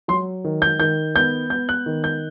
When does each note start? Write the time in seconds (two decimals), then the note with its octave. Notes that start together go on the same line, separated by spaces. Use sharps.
0.08 F#3 C6
0.44 D#3
0.62 G6
0.80 D#3 G6
1.16 B3 G6
1.50 B3 G6
1.69 F#6
1.86 D#3
2.04 G6